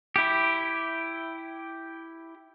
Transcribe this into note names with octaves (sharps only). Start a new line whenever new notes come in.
E4 G4